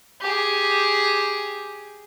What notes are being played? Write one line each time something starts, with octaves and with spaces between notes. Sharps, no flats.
G4 G#4